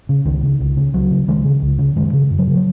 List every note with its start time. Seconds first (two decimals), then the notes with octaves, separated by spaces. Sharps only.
0.09 C#3
0.25 C#2 D#3
0.43 C#3
0.60 C#2
0.77 C#3
0.94 C#2 F#3
1.11 C#3
1.28 C#2 D#3 G#3
1.45 C#3
1.62 C#2
1.79 C#3
1.96 F#2 D#3 G#3
2.13 C#3
2.30 F#2
2.39 F#3
2.47 C#3
2.55 F#3